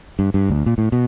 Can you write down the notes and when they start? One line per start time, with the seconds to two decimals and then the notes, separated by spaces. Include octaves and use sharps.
0.19 G2
0.34 G2
0.49 D2
0.66 A#2
0.78 A2
0.92 B2